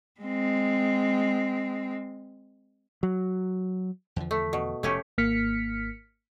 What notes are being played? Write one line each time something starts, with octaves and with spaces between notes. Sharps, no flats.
G#3 C4
F#3
E2 D3 F3
A3
B2
F1 A3 C#4 G4
G#1 A#3 F6 B6 C#7